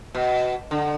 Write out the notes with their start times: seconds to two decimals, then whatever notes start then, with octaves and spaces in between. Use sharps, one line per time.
0.15 B2
0.71 D3